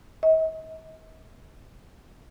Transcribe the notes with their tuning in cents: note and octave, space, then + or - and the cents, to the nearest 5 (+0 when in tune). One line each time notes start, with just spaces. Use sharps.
D#5 +45